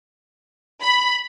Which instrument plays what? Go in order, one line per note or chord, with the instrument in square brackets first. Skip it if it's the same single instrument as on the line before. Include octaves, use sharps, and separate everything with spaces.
[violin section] B5